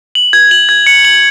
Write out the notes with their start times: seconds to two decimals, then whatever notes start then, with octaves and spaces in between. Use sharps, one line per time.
0.15 F#7
0.33 G#6
0.51 F#7
0.69 G#6
0.87 C#7
1.05 F#7